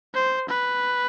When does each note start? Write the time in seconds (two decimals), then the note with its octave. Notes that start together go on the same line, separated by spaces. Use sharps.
0.15 C5
0.49 B4